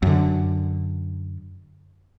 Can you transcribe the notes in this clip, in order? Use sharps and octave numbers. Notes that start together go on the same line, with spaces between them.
F#2 D3